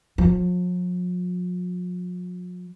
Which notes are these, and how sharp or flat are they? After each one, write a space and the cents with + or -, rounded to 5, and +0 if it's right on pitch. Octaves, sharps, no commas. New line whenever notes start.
F3 +45